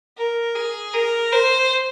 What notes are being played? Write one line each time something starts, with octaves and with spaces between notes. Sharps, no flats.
A#4
G#4
A#4
C5